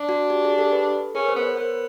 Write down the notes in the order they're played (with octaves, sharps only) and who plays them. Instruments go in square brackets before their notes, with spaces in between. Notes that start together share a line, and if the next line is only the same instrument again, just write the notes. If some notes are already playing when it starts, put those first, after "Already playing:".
Already playing: [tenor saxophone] D4
[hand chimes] F#4
G4
G#4
G4 A4
A4 B4
[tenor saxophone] C#4 [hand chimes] G#4 A#4
[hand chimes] A#4 C5
[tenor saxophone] B3
[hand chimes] B4 C#5
[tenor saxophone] B3 [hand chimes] A#4 C5